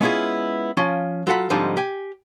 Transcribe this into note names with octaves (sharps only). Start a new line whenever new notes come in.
G#3 B3 C#4 E4 F4 G#4
F3 C#4 F4
F#3 F4 A4 F#5 B5
G#2 D3 F3 G3 C4 D#4
G4 G#5